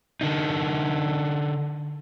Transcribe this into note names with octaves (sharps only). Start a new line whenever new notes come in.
D3 D#4